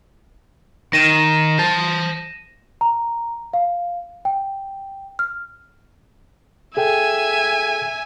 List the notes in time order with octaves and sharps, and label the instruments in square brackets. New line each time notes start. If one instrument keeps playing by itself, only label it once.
[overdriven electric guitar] D#3 [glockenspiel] A#6 D#7 E7
[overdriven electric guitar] C5 A5
[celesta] A#5
F5
G5
F6
[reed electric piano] G#4 A4 G5 [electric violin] E5 G#5